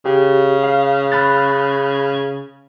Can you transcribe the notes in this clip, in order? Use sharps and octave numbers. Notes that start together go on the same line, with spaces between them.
C#3 G4
F5
B5 F#6 A6